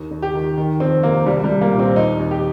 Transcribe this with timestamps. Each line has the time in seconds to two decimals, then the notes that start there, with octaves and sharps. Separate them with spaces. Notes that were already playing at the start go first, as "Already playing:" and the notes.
Already playing: D#2
0.11 D#2
0.22 G4
0.34 D#3
0.57 D#3
0.80 F2 C4
1.03 C3 A#3
1.26 C2 G3
1.44 G3
1.50 C2
1.61 A#3
1.73 A#2
1.79 C4
1.96 D#2 D#4
2.19 D#2
2.31 G4